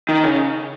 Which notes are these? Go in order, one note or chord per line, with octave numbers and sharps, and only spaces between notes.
D#3
C#3